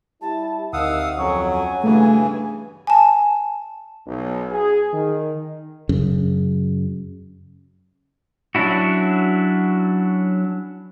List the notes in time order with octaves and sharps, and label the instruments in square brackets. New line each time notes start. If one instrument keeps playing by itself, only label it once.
[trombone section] G3 E4 [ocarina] A5
[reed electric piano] D2 [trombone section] C3 D#3 [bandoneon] F5 F#5 D#6 [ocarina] E6
[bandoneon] F2 F#3 [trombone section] C#4 F#4 [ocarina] C#6
[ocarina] G#5
[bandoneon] G2 C#3 E3 [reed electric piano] A3
[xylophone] G#5 A5
[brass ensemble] B1
G#4
D#3
[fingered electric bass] F#2 C#3
[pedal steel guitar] F#3 C#4 D4 E4 F#4